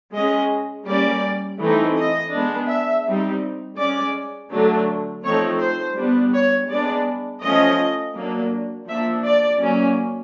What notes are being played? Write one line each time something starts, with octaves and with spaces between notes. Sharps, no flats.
G#3 C#4 D#5
G3 A#3 C#4 D5
E3 A3 C4 D#4
D#5
G#3 B3 D4
E5
G3 C4 D#4
G#3 C#4 D5
D3 F#3 A3 D4
F3 A3 C4 D#4 C#5
C5
G3 B3 D4
C#5
G#3 B3 D4 D5
F3 A3 C#4 D#5
F#3 A#3 D4
F3 A#3 D4 E5
D5
F#3 A#3 C#4